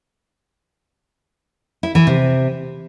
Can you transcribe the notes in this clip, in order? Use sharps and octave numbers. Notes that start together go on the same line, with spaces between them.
E4
E3
C3